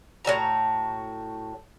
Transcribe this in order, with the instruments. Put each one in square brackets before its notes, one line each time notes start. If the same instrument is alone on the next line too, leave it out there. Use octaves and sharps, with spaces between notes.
[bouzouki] A2 E3 F#4 A#5